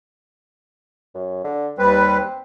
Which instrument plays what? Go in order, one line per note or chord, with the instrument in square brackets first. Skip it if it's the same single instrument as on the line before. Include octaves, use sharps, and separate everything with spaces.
[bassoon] F#2
D3
[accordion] D#2 G3 B4 [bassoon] C4